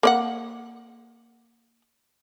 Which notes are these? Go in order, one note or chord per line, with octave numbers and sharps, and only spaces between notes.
A#3 D5 F#5